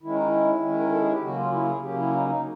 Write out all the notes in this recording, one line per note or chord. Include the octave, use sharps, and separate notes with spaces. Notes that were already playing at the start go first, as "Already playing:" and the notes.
D#3 G#3 C#4 E4
D#4
E4
D#3 G#3 C#4
A#4
A4
G#4
G4
C#3 F#3 A#3 C#4 F#4
F4
E4
G#4
C#3 F#3 A#3 C#4 G4
E4
D#4
D#4